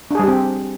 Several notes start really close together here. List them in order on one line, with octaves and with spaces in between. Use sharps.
D4 G#4 G3 G4 C4